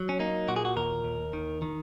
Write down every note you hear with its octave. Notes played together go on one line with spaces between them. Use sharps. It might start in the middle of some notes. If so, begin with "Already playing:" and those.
Already playing: F#3
C#4
A#3 D#4
A#2 F#4
G#4
F#4
D#2 A#4
D#2
D#3
D#3